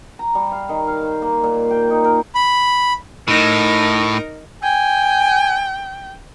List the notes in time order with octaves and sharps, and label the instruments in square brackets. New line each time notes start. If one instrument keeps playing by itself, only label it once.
[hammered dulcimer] A#5
G3
F5
D#3
F5
C5
A#3
A#2
G5
D#4
A#4
[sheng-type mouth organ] B5
[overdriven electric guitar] A2 [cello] D#4 A#4
[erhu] G5 [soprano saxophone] G#5